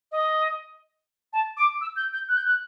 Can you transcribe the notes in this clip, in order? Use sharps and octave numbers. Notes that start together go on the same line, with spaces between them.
D#5
A5
D6
E6
G6
G6
F#6
G6
F#6